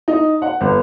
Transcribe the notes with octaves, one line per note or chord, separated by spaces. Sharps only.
D#4
F#5
G1